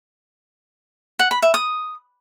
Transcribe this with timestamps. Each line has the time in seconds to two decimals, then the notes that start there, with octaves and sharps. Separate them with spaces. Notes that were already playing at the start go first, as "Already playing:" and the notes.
1.19 F#5
1.31 B5
1.42 E5
1.54 D#6